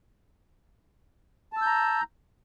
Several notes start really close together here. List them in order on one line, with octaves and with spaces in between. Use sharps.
A5 E6 G6 A#5